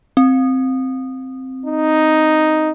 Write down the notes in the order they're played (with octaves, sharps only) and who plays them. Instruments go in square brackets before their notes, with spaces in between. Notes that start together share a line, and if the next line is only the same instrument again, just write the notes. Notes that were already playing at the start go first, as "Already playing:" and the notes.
[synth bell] C4
[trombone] D#4